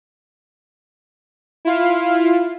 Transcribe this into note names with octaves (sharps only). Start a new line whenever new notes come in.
E4 F4 F5